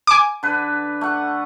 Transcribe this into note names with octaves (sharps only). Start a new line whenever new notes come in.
G#5 D6
D3 B4
A3 F#5